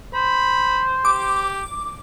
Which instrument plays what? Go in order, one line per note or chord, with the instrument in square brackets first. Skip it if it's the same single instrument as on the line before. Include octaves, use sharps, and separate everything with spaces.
[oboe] C5 [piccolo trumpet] B5
[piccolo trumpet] G4 [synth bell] D6